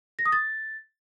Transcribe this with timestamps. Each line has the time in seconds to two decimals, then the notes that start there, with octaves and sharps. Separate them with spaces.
0.19 A#6
0.26 D#6
0.32 A6